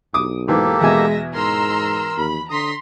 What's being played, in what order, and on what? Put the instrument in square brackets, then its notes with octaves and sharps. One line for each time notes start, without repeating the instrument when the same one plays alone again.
[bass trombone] B1 [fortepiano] D6 D#6
[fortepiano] G#2 E3 [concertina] A#3 G4 A4
[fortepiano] E2 B2 G#5 [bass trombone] G#3 [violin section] E5 A#6
[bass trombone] G#2 [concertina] A#4 [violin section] A#5 C6 E6
[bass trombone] D#2 [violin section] B5
[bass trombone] D3 [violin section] A#5 C6 B6 [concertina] D#6